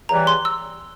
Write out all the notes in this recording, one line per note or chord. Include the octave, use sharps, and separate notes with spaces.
E2 C#3 E3 G3 A#5
C6
E6